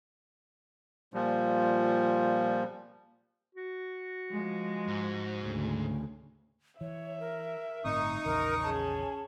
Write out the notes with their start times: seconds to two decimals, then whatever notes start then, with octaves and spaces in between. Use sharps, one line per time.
1.14 A#2 F3 G3
3.55 F#4
4.32 F3 G#3
4.87 G#2
5.43 D2 C#3
6.81 E3 C#5 E5
7.20 A#4
7.84 G1 A2 C4 D#4 C#6 D#6
8.25 A#1 E2 C#3 A#4
8.63 C#4 G#4 A5